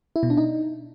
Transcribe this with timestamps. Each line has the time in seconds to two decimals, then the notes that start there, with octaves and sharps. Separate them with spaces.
0.16 E4
0.23 B2
0.30 D4
0.37 D#4